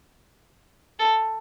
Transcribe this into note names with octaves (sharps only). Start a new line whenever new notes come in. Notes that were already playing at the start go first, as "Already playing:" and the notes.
A4